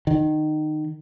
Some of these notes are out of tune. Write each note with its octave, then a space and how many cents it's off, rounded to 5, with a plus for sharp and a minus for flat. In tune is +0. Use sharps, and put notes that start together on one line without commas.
D#3 -20